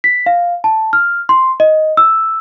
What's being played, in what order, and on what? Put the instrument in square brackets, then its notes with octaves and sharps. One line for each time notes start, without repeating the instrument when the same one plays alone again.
[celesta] B6
F5
A5
F6
C6
D#5
E6